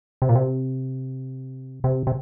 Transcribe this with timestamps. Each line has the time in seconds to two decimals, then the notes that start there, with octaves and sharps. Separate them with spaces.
0.22 C3
0.29 A#2
0.35 C3
1.84 C3
2.07 C3